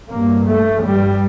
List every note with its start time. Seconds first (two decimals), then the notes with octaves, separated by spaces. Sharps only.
0.11 G2 A#3
0.48 A3
0.85 G2 G3